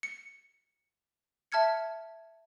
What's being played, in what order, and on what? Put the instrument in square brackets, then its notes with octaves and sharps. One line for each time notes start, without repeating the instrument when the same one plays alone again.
[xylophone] C#7
E5 A5 F6 G#6 C#7